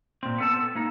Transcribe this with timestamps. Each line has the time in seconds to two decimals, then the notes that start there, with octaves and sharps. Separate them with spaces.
0.23 A#2 C4
0.38 B3 A4 A5
0.75 A#3 D#4